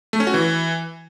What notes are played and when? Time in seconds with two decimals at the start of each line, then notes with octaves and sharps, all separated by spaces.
0.13 A3
0.20 C#4
0.27 F#4
0.34 E3